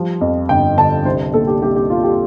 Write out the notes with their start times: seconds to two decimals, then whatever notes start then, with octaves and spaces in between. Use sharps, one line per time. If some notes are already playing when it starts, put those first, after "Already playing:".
Already playing: F3 G3
0.21 F2
0.49 G1 G5
0.78 D3 A5
1.05 C2 C5
1.34 A#2 A4
1.47 G4
1.62 C2 G4
1.76 G4
1.90 G3 F4
2.04 G4